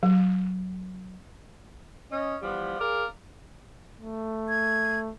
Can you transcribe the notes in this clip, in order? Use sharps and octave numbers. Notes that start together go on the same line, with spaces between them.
F#3
C#4 D#5
E3 F3 G3 B3
G#4 A#4 D5 F5
A3
G#6